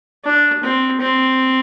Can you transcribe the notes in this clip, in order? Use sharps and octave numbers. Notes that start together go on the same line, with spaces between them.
D4
C4
C4